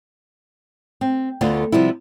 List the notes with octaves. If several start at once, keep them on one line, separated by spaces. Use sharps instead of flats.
C4
D2 D3 B3 F4
C3 F3 G3 B3 E4